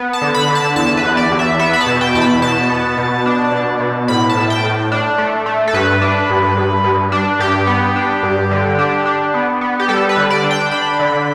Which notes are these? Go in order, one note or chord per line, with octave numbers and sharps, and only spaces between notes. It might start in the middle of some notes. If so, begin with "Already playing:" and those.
Already playing: B3
A5
D3
B5
D3
A5
E2 A5
B4
E2
D5
E2
E5
B3 E5
B5
A5
B2
G5
E2 A5
B5
B2 A5
B3
B2
D4
B2
B2
A2 B5
A5
A2
G5
A2
D4
A3
A3
A4
G2 B4
D4
G2
G2
G2
D4
G2 G4
B3
D4
G2
D3
D4
D4
B3
B3
G4
G3 A4
B4
D3
D5
D4
G5
D4 B5
D3